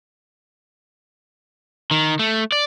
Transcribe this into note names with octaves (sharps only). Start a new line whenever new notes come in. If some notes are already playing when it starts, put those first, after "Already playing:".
D#3
A3
D5